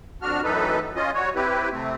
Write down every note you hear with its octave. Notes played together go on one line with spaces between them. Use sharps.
F2 D4 F#4 F6
F#2 A2 E3 D#4 A4 B4
C#4 F4 D#5
G3 F#4 C#5
C4 E4 G4 B4
C3 A3 C4